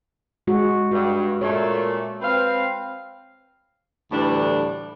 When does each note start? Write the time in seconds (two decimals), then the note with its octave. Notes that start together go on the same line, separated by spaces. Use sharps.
0.47 G#3 F#4
0.91 G2 F#4
1.41 A#2 A3 C#5
2.21 C4 B4 F5
4.12 D2 A2 E3 G3 D4